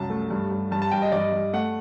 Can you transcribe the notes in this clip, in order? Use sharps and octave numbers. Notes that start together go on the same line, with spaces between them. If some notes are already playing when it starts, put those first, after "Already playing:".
Already playing: C2 F#2 A5
A3
G2
G2
G2 A5
A5
G2 G5
D#5
G2 D5
D#5
G2
A3 F#5